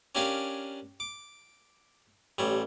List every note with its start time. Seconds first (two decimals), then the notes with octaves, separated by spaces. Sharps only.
0.15 C#4 D4 G4 A#4 F5 G#5
1.00 D6
2.38 A1 G3 C#5